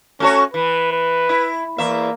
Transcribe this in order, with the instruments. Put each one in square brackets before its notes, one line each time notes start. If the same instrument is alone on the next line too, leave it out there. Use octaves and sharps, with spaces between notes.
[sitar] A3 F#4 C#5 [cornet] C#4
[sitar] E3 [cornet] B4
[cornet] B4
[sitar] E4
[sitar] E2 E5 [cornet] A#3